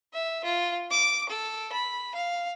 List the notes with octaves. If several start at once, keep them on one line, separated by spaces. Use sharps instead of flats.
E5
F4
D6
A4
B5
F5